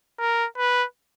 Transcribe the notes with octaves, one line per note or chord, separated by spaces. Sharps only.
A#4
B4